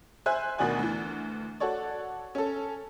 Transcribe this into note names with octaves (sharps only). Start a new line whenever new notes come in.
C5 E5 G#5 F#6
D2 B2 D#3 F#4 D5 G#5
D2 E3
F#4 A4 C#5 D5
C#4 A4